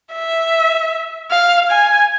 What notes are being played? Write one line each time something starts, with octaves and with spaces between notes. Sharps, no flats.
E5
F5
G#5